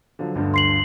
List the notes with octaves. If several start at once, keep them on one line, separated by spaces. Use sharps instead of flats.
D3 F3 F#3
G1 D2 G2
C6 C7 F#7